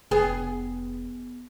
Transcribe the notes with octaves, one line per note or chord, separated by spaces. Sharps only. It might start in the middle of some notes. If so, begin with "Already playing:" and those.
F1 B3 G#4